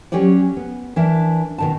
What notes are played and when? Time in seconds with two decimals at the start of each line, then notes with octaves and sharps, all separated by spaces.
0.12 F#3 C#4 G4 C#5 D5
0.57 B3
0.96 E3 D4 A#4 E5
1.58 B2 D#3 A5